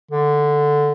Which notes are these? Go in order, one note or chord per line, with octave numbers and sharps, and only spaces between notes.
D3